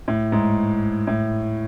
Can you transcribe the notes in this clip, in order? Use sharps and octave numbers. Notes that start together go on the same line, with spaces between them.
A2
G#2
A2